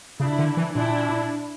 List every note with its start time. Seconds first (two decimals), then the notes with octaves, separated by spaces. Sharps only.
0.20 C#3 D4 E4
0.39 D3
0.57 E3
0.75 A#2 D4 E4